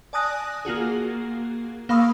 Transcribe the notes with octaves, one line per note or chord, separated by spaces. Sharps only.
D5 G#5 A5 D#6 F#6 A#6
A#3 F4 F#4 G#4
A#3 F5 B5 C#6 D#6 E6